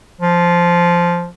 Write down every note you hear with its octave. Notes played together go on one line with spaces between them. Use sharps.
F3